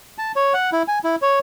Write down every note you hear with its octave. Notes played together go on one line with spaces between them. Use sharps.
A5
C#5
F#5
E4
G#5
E4
C#5